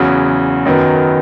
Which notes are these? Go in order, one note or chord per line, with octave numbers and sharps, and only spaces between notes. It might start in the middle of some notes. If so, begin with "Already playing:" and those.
Already playing: E2 C#3 F#3
F#2 D#3 F#3 B3